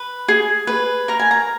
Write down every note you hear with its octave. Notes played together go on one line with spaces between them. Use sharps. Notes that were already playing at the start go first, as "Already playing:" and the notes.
Already playing: B4
G#4
B4
A#4 A#5
G#5
A#5